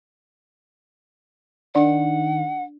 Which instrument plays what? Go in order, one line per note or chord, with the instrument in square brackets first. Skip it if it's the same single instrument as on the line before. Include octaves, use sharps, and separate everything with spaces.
[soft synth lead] D#3 [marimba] D4 D5 [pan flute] F#5